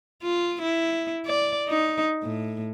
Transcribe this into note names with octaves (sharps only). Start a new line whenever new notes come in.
F4
E4
D5
D#4
A2